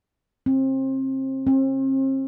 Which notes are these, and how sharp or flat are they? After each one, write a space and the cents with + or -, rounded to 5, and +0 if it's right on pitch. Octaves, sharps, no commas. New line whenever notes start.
C4 +30
C4 +40